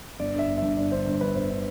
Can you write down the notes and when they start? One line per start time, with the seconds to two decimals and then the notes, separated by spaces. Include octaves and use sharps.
0.19 G1 D5
0.34 D3 E5
0.48 G1
0.58 G2 E5
0.77 G1 D5
0.92 D3 C5
1.06 G1
1.21 G2 B4
1.35 G1 C5
1.50 D3